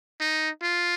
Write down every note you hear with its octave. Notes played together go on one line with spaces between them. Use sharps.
D#4
F4